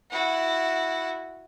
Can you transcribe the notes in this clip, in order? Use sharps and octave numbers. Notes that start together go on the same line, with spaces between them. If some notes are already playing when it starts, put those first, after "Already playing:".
E4 F#4